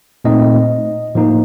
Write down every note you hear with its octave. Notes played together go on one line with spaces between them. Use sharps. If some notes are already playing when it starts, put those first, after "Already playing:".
A#2 A3 C4 D#4 D#5
A2 F3 A#3 D#4